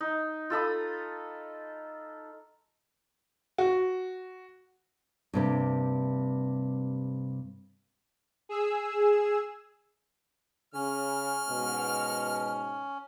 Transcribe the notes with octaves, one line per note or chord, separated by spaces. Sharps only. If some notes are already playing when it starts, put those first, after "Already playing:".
D#4
F4 A4 B5 D#6
F#4
G2 C3 A#3
G#4 E6
C#3 C#4 F6
G#2 B2